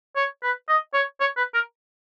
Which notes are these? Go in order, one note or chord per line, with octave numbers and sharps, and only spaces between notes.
C#5
B4
D#5
C#5
C#5
B4
A#4